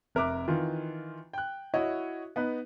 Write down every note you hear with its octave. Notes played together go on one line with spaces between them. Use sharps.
F1 A#4 E5 D6 F#6
D#3 E3 F4
G5 F#6
E4 F#4 C#5 D#5
B3 D#4 B4